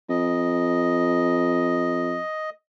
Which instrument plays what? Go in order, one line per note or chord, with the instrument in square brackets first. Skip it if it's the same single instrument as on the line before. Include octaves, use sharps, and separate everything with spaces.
[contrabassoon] F2 [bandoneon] D#5